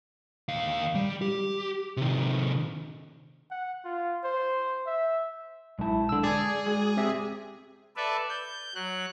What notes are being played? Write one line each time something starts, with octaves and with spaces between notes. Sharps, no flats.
D#2 F5
G3
G4
C3 D#3
F#5
F4
C5
E5
B1 G#3 E4 A5
D3 E6
G#4 D5 G#6
G#3 F#4
C4 G4 E5
A4 B4 D5 E5
G6
F#3 F#6